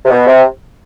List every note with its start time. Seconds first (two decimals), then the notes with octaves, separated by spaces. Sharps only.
0.05 C3
0.10 B2
0.27 C3